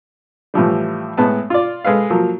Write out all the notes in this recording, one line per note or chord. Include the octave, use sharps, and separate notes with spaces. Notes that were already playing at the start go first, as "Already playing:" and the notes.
A2 E3 F3 G3
A2 G#3 B3 A5
F4 D5
G#3 A4 B4 F5
F3 F#3 A#3